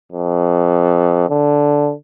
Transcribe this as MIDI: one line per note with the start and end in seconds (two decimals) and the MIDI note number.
0.12 1.25 41
1.30 1.92 50